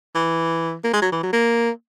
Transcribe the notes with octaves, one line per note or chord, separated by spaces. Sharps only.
E3
A#3
G#3
F#3
E3
F#3
A#3